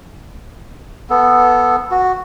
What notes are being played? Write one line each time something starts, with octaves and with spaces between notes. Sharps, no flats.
B3 A4
F#4